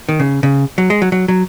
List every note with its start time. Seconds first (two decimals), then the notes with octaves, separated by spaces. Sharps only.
0.09 D#3
0.20 C#3
0.43 C#3
0.78 F#3
0.90 G#3
1.02 F#3
1.12 F#3
1.28 F#3